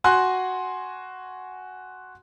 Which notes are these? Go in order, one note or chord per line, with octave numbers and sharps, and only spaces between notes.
F#4 G#5 C6 F#6